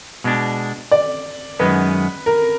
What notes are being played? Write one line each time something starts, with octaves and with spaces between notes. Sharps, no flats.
B2 G#3 D4
D5
F#2 D#3 G#3 B3 B4
A#4